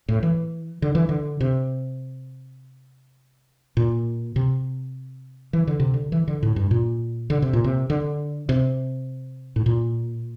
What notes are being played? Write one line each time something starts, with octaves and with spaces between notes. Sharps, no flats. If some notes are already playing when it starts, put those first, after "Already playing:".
A2
E3
D3
E3
D3
C3
A#2
C3
E3
D3
C3
D3
E3
D3
A2
G2
A#2
D3
C3
A#2
C3
D3
C3
A2
A#2